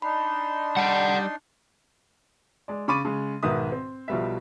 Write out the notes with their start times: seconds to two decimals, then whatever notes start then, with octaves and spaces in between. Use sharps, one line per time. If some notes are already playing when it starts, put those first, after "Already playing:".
0.02 D4 D#4 B5 C6
0.77 G3 D5 F#5
2.68 G#3 D5
2.88 C#3 B5 C#6 D6 A6 D#7
3.05 C#3 G#3
3.43 B1 G#2 D#3 B4 E5 D#6
3.72 C4
4.08 B1 B2 F3 G3 B4 E5